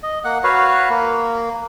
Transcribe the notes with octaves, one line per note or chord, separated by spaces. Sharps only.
D#5
A#3 F#5
F#4 B4 C#5 F5
A#3